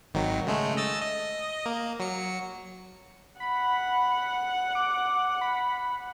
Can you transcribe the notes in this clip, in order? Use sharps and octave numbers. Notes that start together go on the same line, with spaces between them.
G#1 D#3 F#3
C#3 G#3 A3
D#5 E6 A6
D#5
A#3
F#3 C#7
F#5 B5
D6
B5